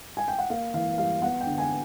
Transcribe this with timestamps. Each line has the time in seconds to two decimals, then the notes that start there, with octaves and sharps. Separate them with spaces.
0.17 G#5
0.28 G5
0.38 F#5
0.50 A#3 F5
0.74 E3 F5
0.98 G3 F5
1.22 B3 F#5
1.41 G5
1.46 D3
1.58 G#5